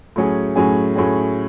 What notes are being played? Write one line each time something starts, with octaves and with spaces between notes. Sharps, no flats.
A2 F#3 C#4 G#4
A2 F#3 C#4 G#4
A2 F#3 C#4 G#4